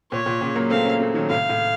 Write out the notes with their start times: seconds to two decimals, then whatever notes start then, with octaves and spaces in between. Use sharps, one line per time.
0.11 A#2 C#5
0.26 A#2
0.41 A#2 C#3
0.56 F#3 A#3
0.70 A3 C4 F5
0.85 A#3 C#4
0.99 A3 C4
1.14 D#3 F#3
1.29 A2 C3 F5
1.49 A2